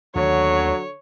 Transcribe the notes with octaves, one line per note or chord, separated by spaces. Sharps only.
D#2 D3 D#3 F#3 A3 C#5